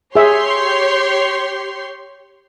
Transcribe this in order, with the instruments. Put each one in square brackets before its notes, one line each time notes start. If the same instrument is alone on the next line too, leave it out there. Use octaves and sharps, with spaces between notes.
[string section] G4 C#5 C6 [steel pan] G#4 E5